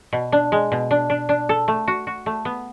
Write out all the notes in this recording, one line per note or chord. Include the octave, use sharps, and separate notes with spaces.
B2
D4
G#3
B2
D4
D4
D4
A4
A3
F#4
F#4
A3
B3